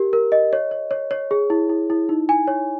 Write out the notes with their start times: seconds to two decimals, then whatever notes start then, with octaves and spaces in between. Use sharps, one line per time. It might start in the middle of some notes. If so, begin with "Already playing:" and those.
Already playing: G4 A#4
0.13 A#4
0.32 D#5
0.53 C#5
0.71 C#5
0.91 C#5
1.11 C#5
1.31 G#4
1.50 E4
1.69 E4
1.90 E4
2.09 D#4
2.29 G#5
2.48 C#5